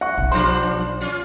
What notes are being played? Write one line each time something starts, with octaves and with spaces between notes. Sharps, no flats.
E5 F#5 C#6
B1
F3 G3 D4 C5 C6
C#4 F4